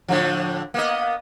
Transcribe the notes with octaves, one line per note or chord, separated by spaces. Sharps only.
A2 D3 F3
A#3 B3 D#5